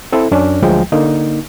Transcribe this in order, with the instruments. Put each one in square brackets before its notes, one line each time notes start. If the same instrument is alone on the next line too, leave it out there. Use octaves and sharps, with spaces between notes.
[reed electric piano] C4 E4 A4
F#2 C#4 D4
D2 F3 F#3 G#3 G5
D3 A#3 D#4